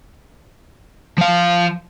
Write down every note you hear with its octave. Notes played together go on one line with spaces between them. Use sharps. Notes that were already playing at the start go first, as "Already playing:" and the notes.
F3 F5